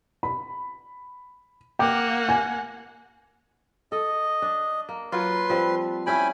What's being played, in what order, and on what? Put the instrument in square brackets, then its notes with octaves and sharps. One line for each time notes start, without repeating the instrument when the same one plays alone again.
[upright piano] B5
[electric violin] A#3 F#5 [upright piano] G5 D6
[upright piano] G#5
[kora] A4 [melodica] D#5
[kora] D4
A#3
[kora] F#3 F4 [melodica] B4 C6
[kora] F3 G3 C4
[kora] G3 C#4 E4 [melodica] G5 G#5 B5